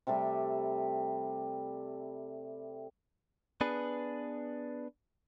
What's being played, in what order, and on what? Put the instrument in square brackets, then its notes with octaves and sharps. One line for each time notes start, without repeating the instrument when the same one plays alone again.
[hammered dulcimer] C3 G3 A3 G4
[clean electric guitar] B3 D4 G#4 B4